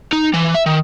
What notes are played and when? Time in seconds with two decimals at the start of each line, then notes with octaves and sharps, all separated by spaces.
0.13 D#4
0.33 E3
0.54 E5
0.66 D#3